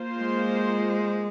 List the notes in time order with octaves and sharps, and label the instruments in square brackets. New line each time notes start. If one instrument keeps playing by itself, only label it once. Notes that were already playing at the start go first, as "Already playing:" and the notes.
Already playing: [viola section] A#3 F4 C5
[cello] G#3